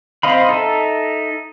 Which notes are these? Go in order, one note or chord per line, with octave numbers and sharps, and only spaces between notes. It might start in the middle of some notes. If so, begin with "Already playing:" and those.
C4 C5 D#5 F5 B5
D#4 A4 E5